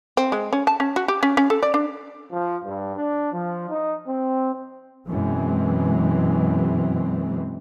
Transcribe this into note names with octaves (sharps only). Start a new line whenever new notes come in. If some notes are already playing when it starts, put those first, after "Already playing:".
C4
G#3
C#4
A5
C#4
F#4
G4
C#4
C#4
A4
D5
D4
F3
G2
D4
F3
D#4
C4
F#2 B2 E3 G#3 C4